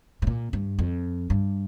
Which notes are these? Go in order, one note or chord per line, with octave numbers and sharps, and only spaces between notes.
A2
A#2
G2
F2
G2